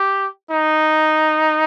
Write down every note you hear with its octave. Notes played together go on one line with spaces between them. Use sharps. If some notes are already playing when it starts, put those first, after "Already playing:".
Already playing: G4
D#4